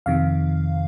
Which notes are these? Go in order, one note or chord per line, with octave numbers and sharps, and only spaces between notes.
F2 C3 D#3 F5